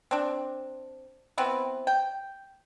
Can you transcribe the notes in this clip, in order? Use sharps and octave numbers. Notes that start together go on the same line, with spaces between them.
C4 D4
E3 B3 C4 B4
G5